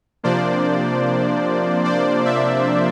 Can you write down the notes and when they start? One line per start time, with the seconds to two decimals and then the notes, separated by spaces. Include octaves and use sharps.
0.23 C3 F3 A#3 D4 C5 D5
1.84 C5 D5
2.25 D5 E5